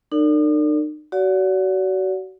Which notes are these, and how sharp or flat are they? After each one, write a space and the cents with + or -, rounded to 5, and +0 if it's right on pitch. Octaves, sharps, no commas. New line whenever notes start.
D#4 -45 A#4 -45 D5 -25
F#4 +30 D5 -40 F#5 -40